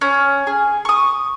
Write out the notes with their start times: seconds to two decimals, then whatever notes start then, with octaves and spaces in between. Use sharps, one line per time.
0.01 C#4
0.47 G#4
0.85 C#6 D#6